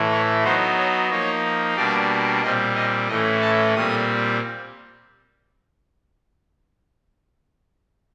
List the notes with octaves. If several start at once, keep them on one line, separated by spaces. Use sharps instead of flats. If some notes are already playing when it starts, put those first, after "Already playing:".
Already playing: A2 E3 A3
C#5
F#3 B3 D#4 C5
C#5
F3 A#3 D#4 C#5
B2 G3 A#3 D4 D5
A#2 G3 C4 D#5
D#5
A2 E3 A3 C#4 D#5
A5
A#2 G3 C4 D#6